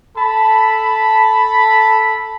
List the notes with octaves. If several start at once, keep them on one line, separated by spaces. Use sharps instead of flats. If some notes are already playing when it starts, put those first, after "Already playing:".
A4 A5 B5